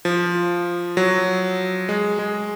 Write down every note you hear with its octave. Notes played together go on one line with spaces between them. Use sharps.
F3
F#3
G#3
G#3